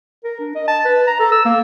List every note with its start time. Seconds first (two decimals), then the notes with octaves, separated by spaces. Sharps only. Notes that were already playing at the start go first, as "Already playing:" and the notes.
0.24 A#4
0.40 D4
0.55 D#5
0.68 A5
0.85 B4
1.07 A#5
1.20 A4
1.32 E6
1.45 A#3